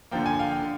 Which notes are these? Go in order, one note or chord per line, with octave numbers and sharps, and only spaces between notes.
D3 F3 A#3 G5
G#5
F5 G5
D3